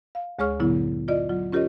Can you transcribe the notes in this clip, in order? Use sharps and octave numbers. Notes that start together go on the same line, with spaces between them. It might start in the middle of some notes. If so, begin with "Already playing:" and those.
F5
D2 G#3 G#4 C#5 C#6 F6
G2 A#2 D3 F#3 B3 E4
F4 D5 D#5
F#3 F4
C#4 F4 G4 A#4 C#5 D#5